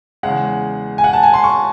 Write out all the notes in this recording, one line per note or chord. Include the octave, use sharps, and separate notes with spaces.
E2 C#3 G#3 F#5
G#5
F#5
A5
G#5
C6
C#6